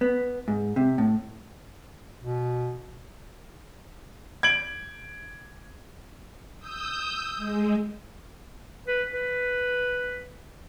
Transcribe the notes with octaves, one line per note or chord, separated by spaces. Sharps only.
B3
G#2
C3
A2
B2
G#6 D7 F#7
D#6 E6 G6
G#3
B4
B4